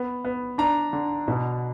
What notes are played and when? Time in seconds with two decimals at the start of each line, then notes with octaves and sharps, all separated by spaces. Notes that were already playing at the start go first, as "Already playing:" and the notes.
Already playing: B3
0.25 B3
0.58 D4 A#5
0.93 D3
1.28 B2